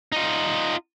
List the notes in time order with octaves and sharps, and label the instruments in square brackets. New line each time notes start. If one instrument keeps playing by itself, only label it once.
[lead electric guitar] D#4 F4